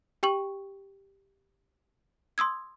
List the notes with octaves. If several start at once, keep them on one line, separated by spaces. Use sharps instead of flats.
G4 G5 C#6 F#7
C6 D#6 E6 G#6